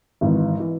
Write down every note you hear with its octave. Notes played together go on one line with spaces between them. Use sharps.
G#1 G#2 E3
E3